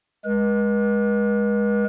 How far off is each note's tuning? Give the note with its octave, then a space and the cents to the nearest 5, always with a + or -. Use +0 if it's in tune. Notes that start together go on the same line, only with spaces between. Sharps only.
G#3 +0 B4 -45